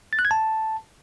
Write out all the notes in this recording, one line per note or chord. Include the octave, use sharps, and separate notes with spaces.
A6
F#6
G#6
A5